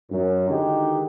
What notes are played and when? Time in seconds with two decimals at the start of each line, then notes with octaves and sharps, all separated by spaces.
0.11 F#2
0.49 D3 D#3 G#3 D#4 F#4 G4